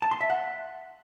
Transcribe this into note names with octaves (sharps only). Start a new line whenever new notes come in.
A5
C6
E5
F#5